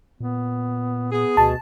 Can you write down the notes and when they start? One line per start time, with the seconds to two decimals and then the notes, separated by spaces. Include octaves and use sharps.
0.20 A#2 B3
1.12 B3 G#4
1.37 D2 B2 A5